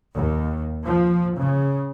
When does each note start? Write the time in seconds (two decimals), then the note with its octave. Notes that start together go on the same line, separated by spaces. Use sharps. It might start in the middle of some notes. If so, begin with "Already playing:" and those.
0.15 D#2
0.85 F3
1.39 C#3